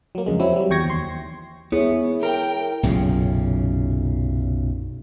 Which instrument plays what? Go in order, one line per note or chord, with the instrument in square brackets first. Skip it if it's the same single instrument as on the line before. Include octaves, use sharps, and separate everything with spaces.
[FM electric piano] F#3 A#3
F2 C#3 G#3
F#3 C4 E4
F#3 G3
E2 G5 C#6 G#6 A#6
D#2 C6
[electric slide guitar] B3 [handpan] E4 G#4 C#5
[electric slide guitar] A#4 [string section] G5
[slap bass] B1 F#2 A#2 C#3